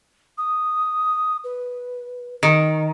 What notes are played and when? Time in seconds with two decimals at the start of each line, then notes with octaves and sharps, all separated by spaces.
0.38 D#6
1.44 B4
2.43 D#3